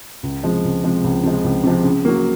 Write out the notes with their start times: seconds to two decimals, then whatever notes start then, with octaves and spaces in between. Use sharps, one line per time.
0.23 C#2
0.43 C3 F3 G#3
0.64 C#2
0.84 C3 F3 G#3
1.04 C#2
1.23 C3 F3 G#3
1.44 C#2
1.64 C3 F3 G#3
1.84 C#3
2.05 F#3 A#3